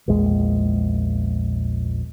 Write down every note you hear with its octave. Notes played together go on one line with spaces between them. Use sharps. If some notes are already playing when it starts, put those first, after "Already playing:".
A#1 E2 G#3